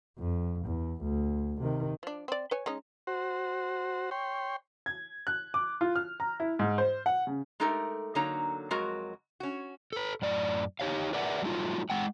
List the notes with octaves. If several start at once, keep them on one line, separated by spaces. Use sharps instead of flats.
F2
E2
D2
C3 D#3
F3 D4
C4 D5
B4 C#5 G#5
G#3 C#4 D#4
F#4 C5
C#5 G5 C6
G#6
F#6
D6
F4
F6
A#5
E4
G#2
C5
F#5
C#3
G#3 A3 D#4 G4 A4 A#4
D3 F#3 A#3 D#4 C#5 A#5
F2 F#3 G#3 F#4 A#4
C#4 F#4
A4 B4
F#2 A2 D5
D#4 G4 C#5 F5
G#4 A#4 B4 D5 E5 F#5
F#3 G3 A3 D#4 F4
G#3 F#5 G5